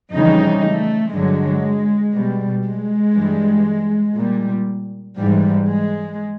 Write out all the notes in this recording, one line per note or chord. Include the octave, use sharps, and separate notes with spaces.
F2 C#3 E3 G3 D#4
A3
G2 D3 F#3 G#3
B2 G3
G#3
G2 E3 G3
A#2 G3
G#2 E3 G3
G#3